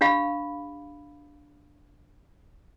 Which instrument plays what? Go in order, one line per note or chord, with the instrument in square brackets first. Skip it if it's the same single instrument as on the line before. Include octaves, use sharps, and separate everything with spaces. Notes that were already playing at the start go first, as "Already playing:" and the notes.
[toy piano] D4 G4 F5 B5